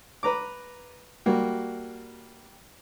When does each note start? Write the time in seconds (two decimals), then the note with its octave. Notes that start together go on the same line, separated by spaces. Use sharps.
0.23 B4 A#5 D6
1.26 G3 A#3 F#4